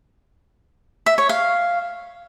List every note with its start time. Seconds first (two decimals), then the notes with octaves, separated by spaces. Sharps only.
1.06 E5
1.18 C#5
1.29 F5